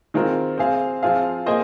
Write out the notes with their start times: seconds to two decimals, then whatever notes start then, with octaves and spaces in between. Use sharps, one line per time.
0.14 D#3 G#3 C4 F4 A#4
0.58 C4 G#4 C5 F5
1.03 F3 C4 F4 G#4 F5
1.46 A#3 G#4 C5 D#5